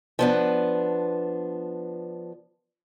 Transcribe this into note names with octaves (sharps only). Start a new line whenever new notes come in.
F3 B3 D4